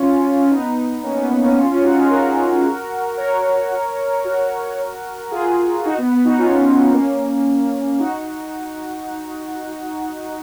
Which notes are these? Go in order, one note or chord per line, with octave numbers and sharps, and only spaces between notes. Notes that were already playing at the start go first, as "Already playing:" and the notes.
Already playing: C#4 F4
B3 D#4
A#3 C#4
B3
B3
A#3 C#4
C#4 F4
C#4 F4
D#4 F#4
F4 G#4
F#4 A#4
A#4 C#5
F#4 A#4
F4 G#4
D#4 F#4
B3
B3
D#4 F#4
C#4 F4
A#3 C#4
D#4 F#4